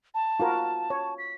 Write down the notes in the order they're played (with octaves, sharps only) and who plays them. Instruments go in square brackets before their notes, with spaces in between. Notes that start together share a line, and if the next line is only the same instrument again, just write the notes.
[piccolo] A5
[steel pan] F4 F#4 A#4
C#5
[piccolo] B6